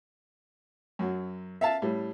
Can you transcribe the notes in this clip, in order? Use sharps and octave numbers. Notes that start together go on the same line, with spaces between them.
F#2 F#3
E5 F5 A5
A2 G3